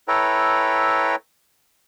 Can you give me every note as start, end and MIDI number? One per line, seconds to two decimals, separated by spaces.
0.08 1.16 64
0.08 1.16 69
0.08 1.16 71
0.08 1.16 73
0.08 1.16 79
0.08 1.16 82